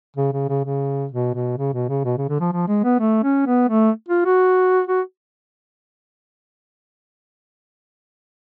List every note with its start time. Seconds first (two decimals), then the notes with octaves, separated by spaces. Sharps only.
0.17 C#3
0.33 C#3
0.49 C#3
0.64 C#3
1.12 B2
1.34 B2
1.58 C#3
1.74 B2
1.89 C#3
2.05 B2
2.17 C#3
2.29 D3
2.40 F3
2.53 F3
2.68 G#3
2.83 B3
2.99 A3
3.23 C#4
3.47 B3
3.69 A3
4.09 F4
4.25 F#4
4.87 F#4